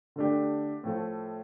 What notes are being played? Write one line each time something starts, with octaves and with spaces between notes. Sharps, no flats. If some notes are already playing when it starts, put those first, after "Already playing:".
D3 A3 D4 G4
A2 F3 A3